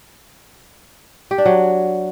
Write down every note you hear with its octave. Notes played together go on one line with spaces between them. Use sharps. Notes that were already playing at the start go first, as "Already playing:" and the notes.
G4
D4
F#3